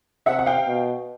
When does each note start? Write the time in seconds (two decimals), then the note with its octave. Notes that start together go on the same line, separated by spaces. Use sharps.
0.26 C3 E5 F#5
0.39 F#5
0.46 F5 G5
0.67 B2